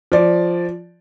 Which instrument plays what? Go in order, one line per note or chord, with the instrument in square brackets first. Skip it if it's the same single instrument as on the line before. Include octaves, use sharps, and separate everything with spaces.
[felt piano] F3 D5